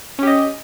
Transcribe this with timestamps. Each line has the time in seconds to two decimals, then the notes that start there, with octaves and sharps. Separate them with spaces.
0.19 C#4
0.23 G4
0.27 D#5